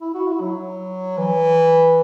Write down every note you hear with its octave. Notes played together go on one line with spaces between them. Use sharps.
E4
F#4
E4
F#3
E3